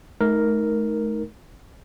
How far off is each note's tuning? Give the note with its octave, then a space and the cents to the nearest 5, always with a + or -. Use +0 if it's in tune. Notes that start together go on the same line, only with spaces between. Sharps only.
A3 -40 D#4 +5 A#4 +0